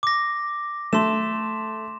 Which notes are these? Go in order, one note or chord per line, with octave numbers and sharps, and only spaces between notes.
D6 A#6
A3 C6 E7